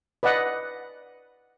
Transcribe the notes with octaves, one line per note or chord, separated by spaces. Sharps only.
B4 D5 D#5 F#5